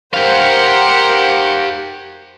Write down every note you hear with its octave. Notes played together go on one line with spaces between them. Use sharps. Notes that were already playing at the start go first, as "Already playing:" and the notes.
G4 A#4 C5 F5 F#5